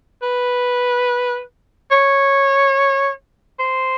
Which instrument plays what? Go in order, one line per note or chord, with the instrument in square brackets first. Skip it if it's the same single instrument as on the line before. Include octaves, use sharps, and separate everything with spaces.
[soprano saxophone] B4
C#5
C5